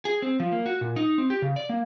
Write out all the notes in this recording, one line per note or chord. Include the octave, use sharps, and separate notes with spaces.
G#4
C4
F3
A#3
F#4
A#2
D#4
C4
G4
C#3
D5
A#3